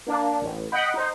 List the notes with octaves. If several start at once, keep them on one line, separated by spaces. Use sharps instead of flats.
A#3 D4
A1
D#5 F#5 G5 B5
D#4 C5